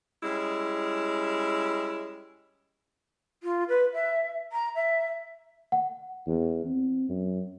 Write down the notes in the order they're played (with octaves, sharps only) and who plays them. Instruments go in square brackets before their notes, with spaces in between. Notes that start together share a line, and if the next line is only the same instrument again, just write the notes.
[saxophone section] G3 G#3 C#4 E4
[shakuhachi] F4
B4
E5
A#5
E5
[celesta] F#5
[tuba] E2
C4
F#2